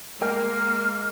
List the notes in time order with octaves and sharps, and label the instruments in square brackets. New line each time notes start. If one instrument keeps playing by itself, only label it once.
[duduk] G#3 [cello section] A#3 [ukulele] A#4 G5 [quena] F6